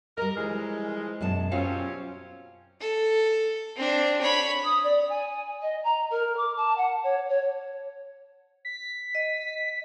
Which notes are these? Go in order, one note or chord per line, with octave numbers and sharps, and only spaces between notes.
G3 A#4 D#5
E3 F3 G#3
F#2 B2 A5
G3 C4 C#4 F4 F#4 F5
A4
C4 D4
C#5 B5
D#6
D5
G#5
D#5
A#5
A#4
D6
A5
F#5
C#5
C#5
B6
D#5